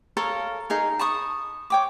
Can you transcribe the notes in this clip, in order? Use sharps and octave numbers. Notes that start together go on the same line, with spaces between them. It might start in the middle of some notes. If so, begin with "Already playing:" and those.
A4 A#4 C#5 F5
D#4 G#4 A#4
A5 B5 C#6 D#6
C#5 G5 D6